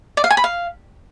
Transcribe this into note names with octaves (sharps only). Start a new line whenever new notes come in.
D5
F5
G#5
B5
F5